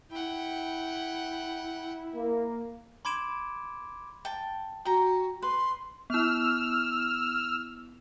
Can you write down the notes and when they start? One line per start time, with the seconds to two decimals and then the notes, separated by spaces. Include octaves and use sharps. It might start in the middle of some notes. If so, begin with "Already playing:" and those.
0.11 E4 F#5 G5
2.15 A#3
3.05 B5 C6 D6 G#6 D7 E7
4.25 G5 A5
4.85 F#4 G5 A#5
5.42 B4 C6
6.10 B3 E4 E6 F6